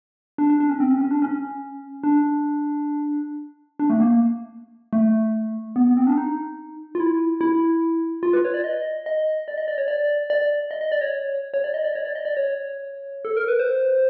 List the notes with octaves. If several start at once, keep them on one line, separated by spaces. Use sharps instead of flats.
D4
D4
D4
C#4
C4
C#4
C#4
D4
C#4
D4
D4
A3
A#3
A3
B3
B3
C4
D4
D#4
F4
E4
E4
F4
B4
C#5
D5
D#5
D#5
D5
D#5
D5
C#5
D5
D5
D#5
D#5
D5
C#5
C#5
D5
D#5
D5
C#5
D5
D#5
D5
C#5
A4
A#4
B4
C5